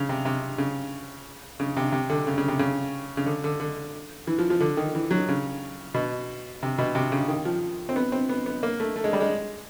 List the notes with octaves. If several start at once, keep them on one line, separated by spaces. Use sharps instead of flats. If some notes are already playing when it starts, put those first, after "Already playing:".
Already playing: C#3
C3
C3
C#3
C#3
C3
C3
D3
C#3
C#3
C3
C#3
C#3
D3
D3
D3
E3
F3
F3
D3
D#3
E3
F#3
C#3
B2
C3
B2
C3
C#3
D#3
F3
C4
B3
C4
B3
B3
A#3
A3
A3
G#3
G3
G#3